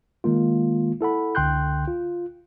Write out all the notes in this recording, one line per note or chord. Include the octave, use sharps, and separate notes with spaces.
D#3 G#3 A#3 F4
E4 A4 F#5 B5
C#2 D3 G5 C6 F#6 G6
F4